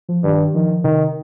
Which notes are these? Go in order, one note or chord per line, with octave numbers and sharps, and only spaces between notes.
F3
G2 D#3
D#3 F3
F3
C3 D#3